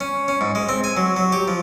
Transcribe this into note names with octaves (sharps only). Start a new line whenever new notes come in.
C#4
C#4
G#2
G#3
C4
G#5
F#3
F#3
G4
F3